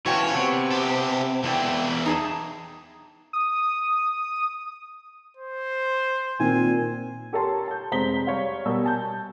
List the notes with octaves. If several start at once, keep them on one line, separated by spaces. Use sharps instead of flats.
E3 C#4 F4 F#4 C#5 G5 A5
C3 B3
G4 A4
E2 E3 D4 E4 G5
D#4 G#4 A5
D#6
C5
A#2 D#3 C4 G#5
G4 A4 A#4 C#5 A5 C6
A5 G6
F1 G#3 C5 A#5 B6 G7
G3 C#5 F5
B2 G3 A#4 E6
G#5 A5 G6